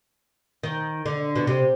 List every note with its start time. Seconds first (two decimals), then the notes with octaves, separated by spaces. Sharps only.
0.63 D#3
1.06 D3
1.35 B2
1.47 C3